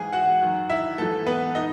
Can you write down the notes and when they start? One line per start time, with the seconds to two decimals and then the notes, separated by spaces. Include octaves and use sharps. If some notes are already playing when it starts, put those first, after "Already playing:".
Already playing: G#2 E3 G#4 G#5
0.13 F#4 F#5
0.41 F#2 D#3
0.69 E4 E5
0.98 G#2 E3 A4
1.26 B3 B4
1.55 D#4 D#5